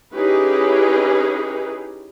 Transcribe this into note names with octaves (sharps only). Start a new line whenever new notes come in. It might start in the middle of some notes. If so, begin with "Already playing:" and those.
C#4 D#4 E4 G4 G#4 B4